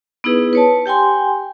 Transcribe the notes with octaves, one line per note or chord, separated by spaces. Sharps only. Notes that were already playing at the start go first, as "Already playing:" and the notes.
B3 D#4 E4 G#4 B4
B4 C#5 A5
G4 G5 G#5 C6